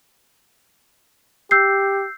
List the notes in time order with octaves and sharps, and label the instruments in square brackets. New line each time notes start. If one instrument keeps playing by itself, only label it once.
[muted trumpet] G4 [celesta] E6 G6 C7